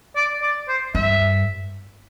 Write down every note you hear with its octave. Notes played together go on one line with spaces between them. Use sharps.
D5
D5
C5
G2 E5